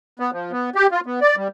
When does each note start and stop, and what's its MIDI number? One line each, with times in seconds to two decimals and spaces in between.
0.20 0.31 59
0.33 0.52 53
0.52 0.70 59
0.75 0.87 67
0.91 1.00 65
1.06 1.20 59
1.21 1.36 74
1.37 1.48 55